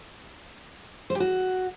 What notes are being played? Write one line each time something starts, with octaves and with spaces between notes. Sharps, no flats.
C5
G4
F#4